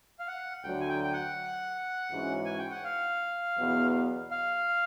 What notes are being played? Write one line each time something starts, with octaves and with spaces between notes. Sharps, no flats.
F5
F#5
D2 D3 F#3 G5
G#5
G5
G5
F#5
G#2 E3 G#3 C#4 F#4
G#5
G5
F#5
F5
E2 B2 F#3 B3
F5